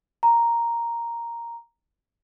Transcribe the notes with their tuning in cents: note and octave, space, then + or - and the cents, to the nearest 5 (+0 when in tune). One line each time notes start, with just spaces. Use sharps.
A#5 +0